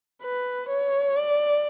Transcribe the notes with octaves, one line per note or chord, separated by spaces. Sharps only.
B4
C#5
D5